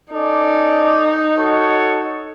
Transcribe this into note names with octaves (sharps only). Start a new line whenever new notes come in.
C#4 D#4 A4 D5
F#4 A4 C#5